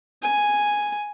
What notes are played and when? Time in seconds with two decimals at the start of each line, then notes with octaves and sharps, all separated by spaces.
0.22 G#5